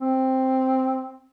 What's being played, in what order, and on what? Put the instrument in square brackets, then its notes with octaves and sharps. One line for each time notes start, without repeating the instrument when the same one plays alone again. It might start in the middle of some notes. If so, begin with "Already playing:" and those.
[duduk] C4